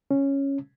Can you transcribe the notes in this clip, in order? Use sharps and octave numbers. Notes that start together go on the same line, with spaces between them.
C#4